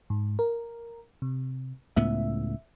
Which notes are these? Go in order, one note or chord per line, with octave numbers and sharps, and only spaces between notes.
G#2
A#4
C3
C#2 A2 B3 E5